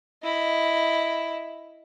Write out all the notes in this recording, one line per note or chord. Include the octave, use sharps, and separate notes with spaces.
E4 D#5